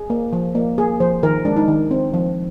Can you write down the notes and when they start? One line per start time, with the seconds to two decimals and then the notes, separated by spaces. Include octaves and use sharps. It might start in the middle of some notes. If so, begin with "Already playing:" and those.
Already playing: G#4
0.10 A#3
0.33 F3
0.55 A#3
0.78 A#3 G#4
1.00 F3 C5
1.23 D#3 A#4
1.45 G#3 D4
1.57 D#4
1.68 D#3
1.91 C4
2.14 F3